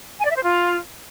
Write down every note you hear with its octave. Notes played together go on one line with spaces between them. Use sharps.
G#5
D5
E5
C5
F4